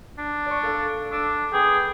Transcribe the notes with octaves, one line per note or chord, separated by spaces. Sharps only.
D4
D5 C#6
A4 F5
D4 D6 E6 D7
B3 G#4 G5